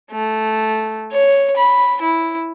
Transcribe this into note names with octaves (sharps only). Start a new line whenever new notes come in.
A3
C#5
B5
E4